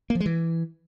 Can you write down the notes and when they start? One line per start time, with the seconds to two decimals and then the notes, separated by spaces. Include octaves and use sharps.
0.10 A#3
0.15 F3
0.20 G#3
0.26 E3